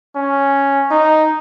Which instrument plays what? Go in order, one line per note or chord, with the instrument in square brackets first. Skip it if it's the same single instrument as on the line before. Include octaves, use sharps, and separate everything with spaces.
[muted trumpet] C#4
D#4